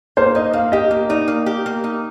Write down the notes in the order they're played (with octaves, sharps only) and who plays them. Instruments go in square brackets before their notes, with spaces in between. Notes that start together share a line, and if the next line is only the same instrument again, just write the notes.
[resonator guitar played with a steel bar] A#3 [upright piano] C5
[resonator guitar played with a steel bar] D#4 [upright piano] D#5
[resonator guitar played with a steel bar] A#3 [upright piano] F5
[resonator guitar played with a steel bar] G4 [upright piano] D#5
[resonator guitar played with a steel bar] A#3 [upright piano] D#5
[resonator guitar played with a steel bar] D#4 [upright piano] D5
[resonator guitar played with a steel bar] A#3
G4
A#3
D#4